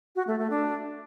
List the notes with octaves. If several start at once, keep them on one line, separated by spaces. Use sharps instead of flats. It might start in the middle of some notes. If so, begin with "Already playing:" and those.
F#4
A3
A3
D4